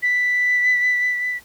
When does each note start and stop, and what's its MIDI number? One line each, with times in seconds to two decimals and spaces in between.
0.03 1.37 95